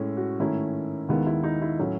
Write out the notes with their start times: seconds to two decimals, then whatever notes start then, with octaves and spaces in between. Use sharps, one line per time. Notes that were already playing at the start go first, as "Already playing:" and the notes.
Already playing: A2 G#3 C#4 E4
0.17 F#4
0.40 G#2 D#3 A3 C#4 E4
1.09 D#2 D#3 G#3 B3 E4
1.26 E4
1.44 D#4
1.62 E4
1.79 A2 F#3 C#4 E4